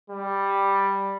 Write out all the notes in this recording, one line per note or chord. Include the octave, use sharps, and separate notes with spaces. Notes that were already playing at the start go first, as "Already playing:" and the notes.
G3